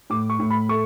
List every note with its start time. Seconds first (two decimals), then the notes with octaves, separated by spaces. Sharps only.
0.10 A2 D6
0.30 C#6
0.39 A2
0.50 B5
0.69 A3 C#6